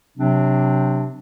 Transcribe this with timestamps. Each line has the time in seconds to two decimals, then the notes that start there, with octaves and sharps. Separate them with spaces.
0.17 C3 F#3 C4 D4